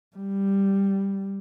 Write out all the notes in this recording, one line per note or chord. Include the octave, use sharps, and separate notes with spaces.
G3